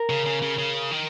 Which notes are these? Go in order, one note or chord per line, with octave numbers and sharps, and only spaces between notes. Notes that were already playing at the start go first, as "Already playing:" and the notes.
Already playing: A#4
C#3
C#3
C#3
C#3
D#3